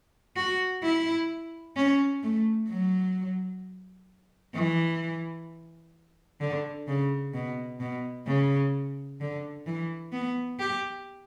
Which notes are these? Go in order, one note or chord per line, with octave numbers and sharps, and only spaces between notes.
F#4
E4
C#4
A3
F#3
E3
D3
C#3
B2
B2
C#3
D3
E3
B3
G4